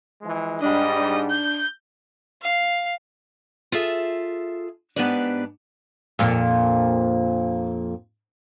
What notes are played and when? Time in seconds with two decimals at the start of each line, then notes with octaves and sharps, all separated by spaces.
0.22 E3 F3 G#3
0.62 G#2 G3 D4 D#5
0.94 D4
1.30 G6
2.42 F5
3.72 F4 G#4 A4 E5
4.96 G#2 B3 D4 G4 B4 D5
6.19 F2 A#2 D4